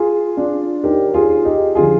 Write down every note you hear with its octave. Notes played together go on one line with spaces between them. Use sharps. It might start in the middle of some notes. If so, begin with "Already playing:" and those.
Already playing: F4 G#4
D4 F4
D#2 D#3 G4 A#4
F4 G#4
D#4 G4
D3 F3 F4 G#4